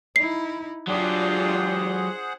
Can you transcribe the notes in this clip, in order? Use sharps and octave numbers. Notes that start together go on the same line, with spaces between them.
D#4 E4 C7
F#3 D4 F4 G4 G#4 C5 F#5